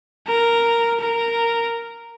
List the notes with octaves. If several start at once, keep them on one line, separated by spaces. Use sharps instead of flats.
A#4
A#4